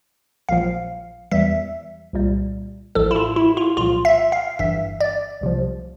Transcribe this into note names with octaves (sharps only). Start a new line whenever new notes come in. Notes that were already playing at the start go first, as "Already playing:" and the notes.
A#1 A#2 F3 F5
E2 E3 G3 E5
C2 A#2 G3
A1 A2 F3 A4
E4
F4
E4
F4
C2 A#2 F3 F4
E5
F5
G1 G2 E3 E5
D5
C2 C3 F3